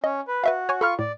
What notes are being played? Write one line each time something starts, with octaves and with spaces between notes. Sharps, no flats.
C#4 D#5
B4
F#4 B4 E5 F5
C#5 G#5 C#6
F4 A4 B5 C#6 F6
A2 D5